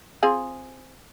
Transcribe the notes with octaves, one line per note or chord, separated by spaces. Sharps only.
C4 F4 G#4